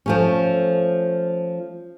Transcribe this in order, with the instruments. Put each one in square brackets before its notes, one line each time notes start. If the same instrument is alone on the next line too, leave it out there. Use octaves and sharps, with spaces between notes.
[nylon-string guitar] F3 A3 C#4